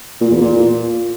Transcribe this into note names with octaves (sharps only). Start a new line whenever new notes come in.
A#2
E2
A#2